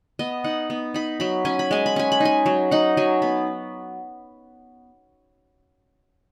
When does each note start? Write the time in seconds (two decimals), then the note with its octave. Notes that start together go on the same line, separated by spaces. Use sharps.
0.19 B3 D#5
0.44 D#4 F#5
0.70 B3
0.94 D#4 B5
1.20 F#3 B5
1.45 C#4 G#5
1.59 B5
1.71 G#3 G#5
1.86 B5
1.96 C#4 G#5
2.12 B5
2.20 D#4 G#5
2.46 F#3
2.71 D#4 F#5
2.97 F#3 G#5
3.22 B3 B5